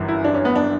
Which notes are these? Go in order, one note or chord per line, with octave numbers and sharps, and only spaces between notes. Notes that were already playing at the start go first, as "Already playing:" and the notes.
Already playing: G1 F#2 E3
E4
D4
C#4
B3
D4